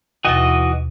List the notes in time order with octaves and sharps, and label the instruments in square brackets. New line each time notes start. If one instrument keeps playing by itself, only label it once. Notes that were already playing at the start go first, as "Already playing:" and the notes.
[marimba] D#2 B2 A6 [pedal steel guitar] E3 F#4 D#5